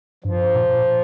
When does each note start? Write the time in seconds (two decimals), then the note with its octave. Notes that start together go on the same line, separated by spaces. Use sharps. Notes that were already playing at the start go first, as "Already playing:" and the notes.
0.24 G2 F3
0.55 A#2